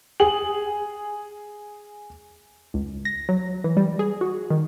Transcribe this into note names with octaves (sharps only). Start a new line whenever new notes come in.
G#4 F#7
C#2
A#6
F#3
E3
G3
G#4
F#4
D#3